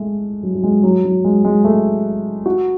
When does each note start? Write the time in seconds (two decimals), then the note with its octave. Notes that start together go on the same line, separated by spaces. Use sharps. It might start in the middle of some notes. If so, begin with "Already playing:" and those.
Already playing: G#3 A3
0.43 F#3
0.55 F#3
0.64 G#3
0.83 F#3
1.04 F#3
1.24 G#3
1.45 G#3
1.64 A3
2.46 F#4